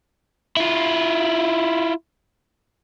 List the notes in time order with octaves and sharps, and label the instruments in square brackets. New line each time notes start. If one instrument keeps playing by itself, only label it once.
[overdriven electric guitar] E4 F4